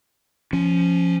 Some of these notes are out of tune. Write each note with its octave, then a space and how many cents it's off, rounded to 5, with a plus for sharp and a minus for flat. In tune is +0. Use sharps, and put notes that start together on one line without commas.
F3 -15 C#4 +0